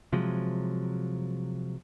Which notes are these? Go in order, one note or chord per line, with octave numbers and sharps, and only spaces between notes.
C3 F3 F#3 G#3